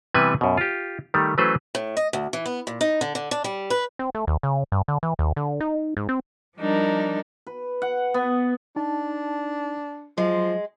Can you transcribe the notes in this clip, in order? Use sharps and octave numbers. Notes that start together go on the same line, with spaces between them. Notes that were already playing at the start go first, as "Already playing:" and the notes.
C3 E3 G3 B3 B4 G#5
F#2 B2
F4 G4
D#3 G3 A3
E3 F#3 A3 C#4 B4 C5
A2
D#5
D2
E3
B3
A#2
D#4
D3
D3
D4
G3
B4
C4
A3
D#2
C#3
G2
D3
E3
D#2
D3
D#4
G#2
C4
F3 G3 D4 D#4 A#4
B4
F#5
B3
D4 D#4 A5
F3 F#3 G#3